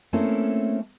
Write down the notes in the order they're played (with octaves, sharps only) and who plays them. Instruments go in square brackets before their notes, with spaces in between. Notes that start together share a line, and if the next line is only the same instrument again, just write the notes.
[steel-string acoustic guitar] A3 A#3 C4 C#4 E4 A4